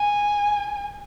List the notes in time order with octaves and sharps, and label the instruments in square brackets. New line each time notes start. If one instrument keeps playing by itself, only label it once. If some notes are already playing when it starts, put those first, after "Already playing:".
Already playing: [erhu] G#5